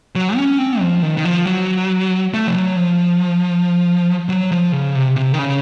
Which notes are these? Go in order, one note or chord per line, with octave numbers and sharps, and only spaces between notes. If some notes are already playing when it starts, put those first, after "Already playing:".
F#3
C#4
C4
F3
D#3
D#3
F3
F#3
A3
F3
F#3
F3
F#3
F3
C#3
C3
C3
D#3
C#3